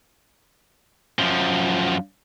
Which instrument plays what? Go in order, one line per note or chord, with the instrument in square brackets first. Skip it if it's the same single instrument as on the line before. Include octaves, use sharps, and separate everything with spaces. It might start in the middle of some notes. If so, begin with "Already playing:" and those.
[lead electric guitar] F#2 F3